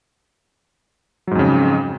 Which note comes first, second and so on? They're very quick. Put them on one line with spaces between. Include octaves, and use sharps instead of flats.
F#3 G#2 F2 C#3